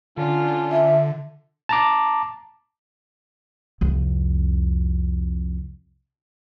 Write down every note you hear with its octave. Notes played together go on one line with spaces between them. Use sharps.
D3 C#4 D4 F4
E5
A5 A#5 D6
C2 F2